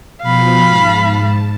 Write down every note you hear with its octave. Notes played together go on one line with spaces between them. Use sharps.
B2 F3 F5 B5
G#2 A5